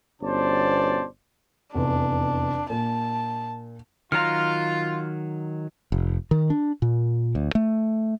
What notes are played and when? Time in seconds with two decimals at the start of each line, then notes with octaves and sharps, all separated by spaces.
0.22 G1 B2 C#4 C5 D5 A5
1.74 F1 E2 D4
2.70 A#2 A5
4.12 D#3 F#3 F4 A#5 F6
5.92 F1
6.31 D#3
6.50 D4
6.82 A#2
7.35 D2
7.55 A3